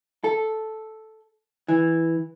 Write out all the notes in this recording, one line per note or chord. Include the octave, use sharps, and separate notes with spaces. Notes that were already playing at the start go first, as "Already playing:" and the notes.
A4
E3